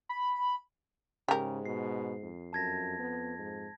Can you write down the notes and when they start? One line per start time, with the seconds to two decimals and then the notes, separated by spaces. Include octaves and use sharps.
0.09 B5
1.28 G#2 C#3 G4 A#4
1.66 B2 C7
2.23 F2
2.53 F#2 A5 G#6 A#6
2.99 B3
3.39 G#2